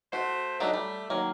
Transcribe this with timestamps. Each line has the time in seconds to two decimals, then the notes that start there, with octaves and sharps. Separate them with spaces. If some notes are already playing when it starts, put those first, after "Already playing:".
0.13 A3 F#4 C5
0.60 F#3 A3 D4 D#4
0.73 G3
1.10 D#3 F#3 A#3